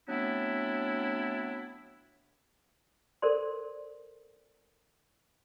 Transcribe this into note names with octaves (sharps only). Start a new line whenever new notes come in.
F#3 A3 B3 C4 D4 E4
A4 A#4 C5 D5 C6